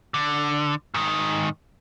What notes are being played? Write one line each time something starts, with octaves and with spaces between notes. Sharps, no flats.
D3
G#2 D#3